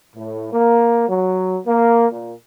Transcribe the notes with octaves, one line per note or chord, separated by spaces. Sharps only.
A2
A#3
F#3
A#3
A#2